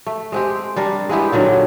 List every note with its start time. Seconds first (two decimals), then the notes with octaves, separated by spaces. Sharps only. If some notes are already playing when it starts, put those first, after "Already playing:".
0.06 A3
0.32 G#3 C4 G4
0.76 G3 D4 A#4
1.09 G#3 B3 E4 G4
1.32 A#2 D3 D#3 F#3